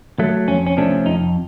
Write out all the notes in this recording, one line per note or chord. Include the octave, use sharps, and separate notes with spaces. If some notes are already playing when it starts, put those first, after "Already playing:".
F#3 A3
F2 C#4
C#4
C3 F3 A3 C#4 D4
F2 D#4